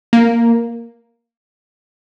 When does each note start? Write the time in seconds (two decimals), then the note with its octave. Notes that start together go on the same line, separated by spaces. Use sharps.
0.13 A#3